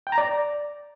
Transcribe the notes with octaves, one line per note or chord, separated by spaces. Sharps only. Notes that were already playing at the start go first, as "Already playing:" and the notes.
G5
A#5
D5